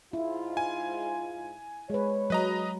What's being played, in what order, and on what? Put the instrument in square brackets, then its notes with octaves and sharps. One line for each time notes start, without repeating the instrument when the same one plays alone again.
[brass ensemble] G#2 F4 [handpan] E4
[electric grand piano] G#5
[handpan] G#3 B4 [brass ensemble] C#5
[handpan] F#3 [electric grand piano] B4 D#5 A#5